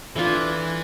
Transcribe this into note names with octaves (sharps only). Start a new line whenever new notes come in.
E3 A3 D4 F4